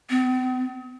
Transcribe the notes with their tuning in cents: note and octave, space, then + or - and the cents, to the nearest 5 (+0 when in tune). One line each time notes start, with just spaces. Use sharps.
C4 -45